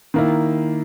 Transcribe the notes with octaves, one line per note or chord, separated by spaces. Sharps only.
D#3 A#3 E4